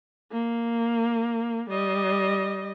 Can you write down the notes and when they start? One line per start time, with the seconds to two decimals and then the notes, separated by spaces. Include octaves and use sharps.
0.32 A#3
1.70 G3 D#5